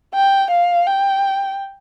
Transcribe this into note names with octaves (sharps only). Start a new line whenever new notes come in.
G5
F5
G5